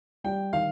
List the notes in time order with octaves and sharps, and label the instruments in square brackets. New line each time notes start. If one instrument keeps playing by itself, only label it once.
[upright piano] G3 [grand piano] G5
[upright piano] D#3 [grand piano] F5